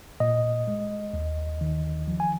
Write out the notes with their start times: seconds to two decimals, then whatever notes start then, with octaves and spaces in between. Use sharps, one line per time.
0.20 A#2 D#5
0.67 G#3
1.13 D#2
1.61 D#3
2.08 F3
2.20 G#5